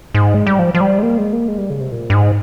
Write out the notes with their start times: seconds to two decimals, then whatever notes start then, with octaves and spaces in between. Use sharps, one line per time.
0.15 G#2
0.34 G#3
0.47 G3
0.59 F3
0.75 F3
0.81 G3
0.98 G#3
1.03 A#3
1.18 G#3
1.33 A#3
1.48 G#3
1.58 G3
1.70 C#3
1.80 C3
1.92 A#2
2.10 G2
2.14 G#2